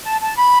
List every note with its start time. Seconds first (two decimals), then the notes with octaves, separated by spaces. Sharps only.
0.05 A5
0.21 A5
0.37 B5